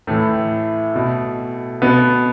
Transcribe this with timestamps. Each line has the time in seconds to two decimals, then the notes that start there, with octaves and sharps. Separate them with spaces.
0.07 A2 E3 A3
0.95 B2
1.82 B2 B3